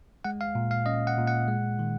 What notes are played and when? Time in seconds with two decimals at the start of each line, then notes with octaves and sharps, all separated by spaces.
0.24 G#3 F#5
0.41 F5
0.55 A#2
0.71 F5
0.86 C#4 D#5
1.07 F#5
1.18 A#2
1.27 F#5
1.48 G#3
1.79 D#3